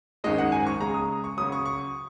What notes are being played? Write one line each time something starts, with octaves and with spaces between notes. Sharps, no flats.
G#1 F#2 D#3 G#3 D#5
F#5
G#5
C#6
C#2 C#3 G#3 A#5
D#6
C#6
C#2 C#3 F#3 D#6
C#6
C#6